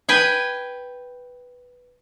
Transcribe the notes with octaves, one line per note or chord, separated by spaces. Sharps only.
B4 G5 G#5